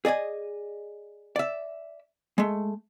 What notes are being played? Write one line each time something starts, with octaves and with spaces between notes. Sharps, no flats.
G#4 D5 D#5 G#5
D5 E5
G#3 A3